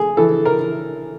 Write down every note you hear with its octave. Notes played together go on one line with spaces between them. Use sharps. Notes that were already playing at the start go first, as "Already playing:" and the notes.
Already playing: A3 G#4
E3 A4
A#4